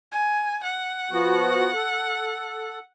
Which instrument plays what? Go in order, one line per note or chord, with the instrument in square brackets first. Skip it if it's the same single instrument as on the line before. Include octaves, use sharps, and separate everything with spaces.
[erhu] G#5
F#5
[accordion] F3 B3 F#4
A4